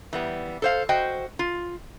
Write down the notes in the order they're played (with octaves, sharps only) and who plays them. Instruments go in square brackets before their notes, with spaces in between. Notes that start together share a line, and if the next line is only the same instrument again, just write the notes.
[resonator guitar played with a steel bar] E3 G3 B3
A4 C5 F5
F#4 C5 D#5 G5
F4